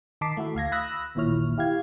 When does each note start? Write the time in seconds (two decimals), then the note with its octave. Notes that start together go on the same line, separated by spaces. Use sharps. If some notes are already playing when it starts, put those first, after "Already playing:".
0.21 D#3 D#4 A5 D6 B6 C7
0.37 A3 E4 F#4 A4
0.55 D2 F5 G#6 A#6
0.72 B5 D#6 E6 F#6 A#6
1.15 A1 D#2 A#2 E4 C#5 F6
1.58 E4 G4 F5 G#6